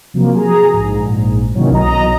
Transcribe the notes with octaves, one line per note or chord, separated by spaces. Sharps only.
C3 F3 F#3 A#3
G#4 A#5
A#1 G#2
C3 D#3 E3 F#3 A#3 C#4
B1 F#3 D#5 A#5